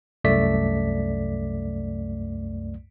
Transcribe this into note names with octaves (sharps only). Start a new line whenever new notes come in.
C2 F#2 A3 D5 B6